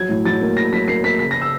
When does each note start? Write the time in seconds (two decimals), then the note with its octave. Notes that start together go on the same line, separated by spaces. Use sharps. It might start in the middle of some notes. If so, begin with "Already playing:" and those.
Already playing: F#3 G#6
0.09 A2
0.25 F#3 A6
0.41 A#3
0.57 A2 A#6
0.73 F#3 B6
0.88 A#3 C7
1.03 A#3 B6
1.19 C#3 B6
1.31 A#6
1.35 C#3
1.41 E6